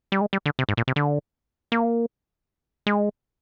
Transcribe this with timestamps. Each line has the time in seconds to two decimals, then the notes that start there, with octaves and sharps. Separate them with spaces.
0.12 G3
0.21 G#3
0.33 G3
0.46 D3
0.59 C3
0.69 G#2
0.77 A#2
0.88 C3
0.96 D3
1.72 A#3
2.87 G#3